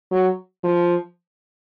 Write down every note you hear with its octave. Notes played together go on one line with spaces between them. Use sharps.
F#3
F3